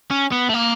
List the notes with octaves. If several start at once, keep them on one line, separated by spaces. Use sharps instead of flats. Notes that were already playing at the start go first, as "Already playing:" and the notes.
C#4
B3
A3
A#3